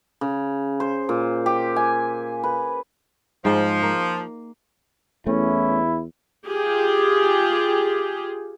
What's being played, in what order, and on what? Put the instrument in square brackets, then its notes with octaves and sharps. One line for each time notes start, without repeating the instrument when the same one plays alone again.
[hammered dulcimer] C#3
C5
A#2
G4
G#5
B4
[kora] G#2 G#3 G5 [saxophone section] F3
[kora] A#3
[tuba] E2 [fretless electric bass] A3 [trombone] C#4 [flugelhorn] E4
[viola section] F4 G4 G#4